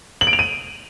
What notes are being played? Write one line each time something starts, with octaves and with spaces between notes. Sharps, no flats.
F#7
D7
F7
D#7